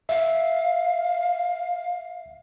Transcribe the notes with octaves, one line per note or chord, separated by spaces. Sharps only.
E5 F5